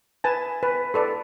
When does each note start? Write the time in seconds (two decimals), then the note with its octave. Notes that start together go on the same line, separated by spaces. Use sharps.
0.24 B4 G#5 A5
0.63 B4
0.94 A4 B4 D5